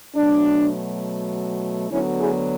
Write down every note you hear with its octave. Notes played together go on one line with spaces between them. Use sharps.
B2 F#3 A3 D4
D2 D3 F#3 B3 C#4 E4
E4 G#4